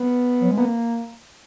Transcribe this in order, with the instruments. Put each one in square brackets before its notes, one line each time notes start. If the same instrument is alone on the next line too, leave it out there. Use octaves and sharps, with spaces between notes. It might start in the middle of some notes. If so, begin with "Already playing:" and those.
Already playing: [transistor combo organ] B3
[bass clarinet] F#3
G#3
[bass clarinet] A#3 [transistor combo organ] B3